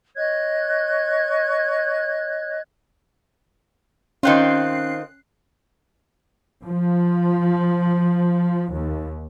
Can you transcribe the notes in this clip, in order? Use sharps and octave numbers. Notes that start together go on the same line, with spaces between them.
C#5 D#5 F#6 G#6
D#3 C4 C#4 F4 F#6 C7
F3
D#2